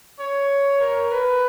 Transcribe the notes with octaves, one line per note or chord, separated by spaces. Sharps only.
C#5
A#4
B4